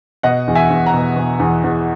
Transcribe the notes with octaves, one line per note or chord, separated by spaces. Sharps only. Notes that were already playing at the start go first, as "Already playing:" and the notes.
B2 D#5 F#5
E2
E5 G#5
E2
F#5 A#5
B2
B2
E2
E2